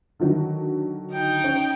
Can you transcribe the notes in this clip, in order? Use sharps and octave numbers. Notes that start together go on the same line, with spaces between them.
D3 D#3 F#3
D#4 G5
C#4